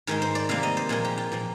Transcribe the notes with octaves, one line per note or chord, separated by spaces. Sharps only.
G#2 D#3 G#3 A#4
C5
D5
C3 G3 A#3 F5
D#5
C5
A#2 F3 G#3 A#4
G4
F4
A#2 F3 A#3